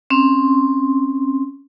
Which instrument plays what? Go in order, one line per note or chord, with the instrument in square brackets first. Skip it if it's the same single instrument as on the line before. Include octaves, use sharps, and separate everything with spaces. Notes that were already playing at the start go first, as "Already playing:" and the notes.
[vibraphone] C4 C#4 C6